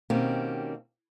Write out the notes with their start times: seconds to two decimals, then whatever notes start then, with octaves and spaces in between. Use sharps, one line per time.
0.10 B2 D#3 A#3 C4 C#4 G4